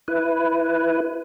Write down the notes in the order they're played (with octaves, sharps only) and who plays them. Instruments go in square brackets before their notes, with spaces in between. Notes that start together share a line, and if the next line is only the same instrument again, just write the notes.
[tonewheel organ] E4 B4